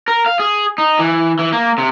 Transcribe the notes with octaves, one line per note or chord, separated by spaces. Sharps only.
A#4
F5
G#4
D#4
E3
E3
A#3
C3